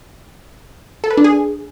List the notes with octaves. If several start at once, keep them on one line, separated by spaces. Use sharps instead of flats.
A4
B4
D4
G#4